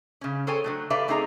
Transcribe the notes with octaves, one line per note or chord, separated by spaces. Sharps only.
C#3 C#4
G#4 A4 C5 C#5 G5 G#5
D3 F#3 A3
G4 A4 B4 D5 E5 F5
A3 C4 D#4 G#4 A#4 A#5